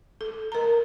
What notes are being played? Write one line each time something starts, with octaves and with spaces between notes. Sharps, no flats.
A4
A#4 A#5